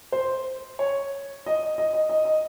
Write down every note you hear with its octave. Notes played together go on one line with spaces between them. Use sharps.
C5
C#5
D#5
D#5
D#5
D#5
D#5
D#5